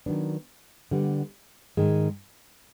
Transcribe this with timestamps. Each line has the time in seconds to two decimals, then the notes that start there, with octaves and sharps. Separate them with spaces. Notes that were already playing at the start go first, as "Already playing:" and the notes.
0.06 D#3 F#3 B3 D4
0.91 D3 G3 B3
1.77 G#2 D#3 G#3